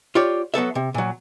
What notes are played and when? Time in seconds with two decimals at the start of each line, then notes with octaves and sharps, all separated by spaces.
0.15 F4 G4 C#5 D5
0.54 F#3 B3 A4 E5
0.75 C3
0.94 A#2 F#3